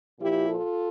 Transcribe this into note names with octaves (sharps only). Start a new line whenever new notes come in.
A#2 F3 E4 G4
F4 A4